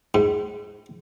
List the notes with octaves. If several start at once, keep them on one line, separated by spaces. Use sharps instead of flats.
G#2